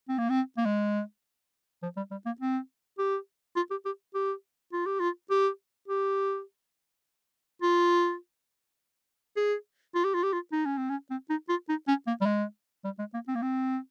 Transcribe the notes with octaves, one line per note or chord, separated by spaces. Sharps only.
C4
A#3
C4
A#3
G#3
F3
G3
G3
A#3
C4
G4
F4
G4
G4
G4
F4
G4
F4
G4
G4
F4
G#4
F4
G4
F4
G4
F4
D#4
C#4
C4
C#4
C4
D#4
F4
D#4
C#4
A#3
G3
G#3
G3
G#3
A#3
C4
A#3
C4